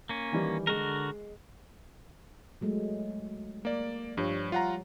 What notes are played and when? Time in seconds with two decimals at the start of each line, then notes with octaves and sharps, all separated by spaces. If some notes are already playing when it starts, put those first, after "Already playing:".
0.09 A#3 C#4
0.32 D#3 E3 G3
0.67 D3 G#3 F#4 A#4
2.61 F#3 G#3 A3
3.65 A#3 D5
4.17 G2 F3 G3 C#5
4.52 F4 F#5 A#5